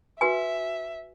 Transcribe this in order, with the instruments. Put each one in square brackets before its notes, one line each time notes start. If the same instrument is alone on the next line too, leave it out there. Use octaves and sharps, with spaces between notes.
[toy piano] F#4 B4 G#5 [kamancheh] E5